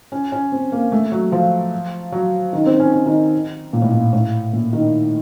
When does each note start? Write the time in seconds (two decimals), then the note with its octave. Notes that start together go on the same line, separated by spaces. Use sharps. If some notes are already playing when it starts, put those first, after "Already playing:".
0.12 C#4
0.32 C#4
0.52 C4
0.72 A#3
0.92 A3
1.12 F#3
1.32 F3
2.12 F#3
2.53 D#3
2.66 C4
2.80 C#4
2.93 C#4
3.06 D#3
3.73 A#2
3.82 A2
3.91 A#2
4.13 A2
4.53 A#2
4.73 D#3